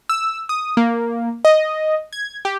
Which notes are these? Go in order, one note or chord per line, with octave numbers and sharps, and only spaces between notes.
E6
D#6
A#3
D#5
G#6
G4